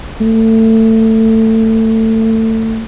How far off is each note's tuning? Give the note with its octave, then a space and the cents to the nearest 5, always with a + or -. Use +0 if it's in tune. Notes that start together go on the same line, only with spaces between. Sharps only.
A3 +20